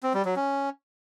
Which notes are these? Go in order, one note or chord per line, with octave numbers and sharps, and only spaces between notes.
C4
G3
F#3
C#4